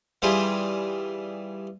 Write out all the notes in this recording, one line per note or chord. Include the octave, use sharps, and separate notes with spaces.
E3 G3 E4 F4 G#4